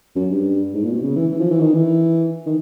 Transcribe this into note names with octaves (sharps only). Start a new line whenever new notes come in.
F#2
G2
G#2
A#2
B2
C#3
E3
E3
F3
E3
D#3
E3
D#3